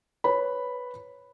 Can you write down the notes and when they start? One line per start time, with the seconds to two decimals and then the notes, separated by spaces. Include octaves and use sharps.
0.24 B4 C#5 B5